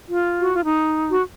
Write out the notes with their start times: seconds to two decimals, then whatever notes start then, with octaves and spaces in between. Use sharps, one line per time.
0.09 F4
0.41 F#4
0.54 F4
0.65 D#4
1.10 F#4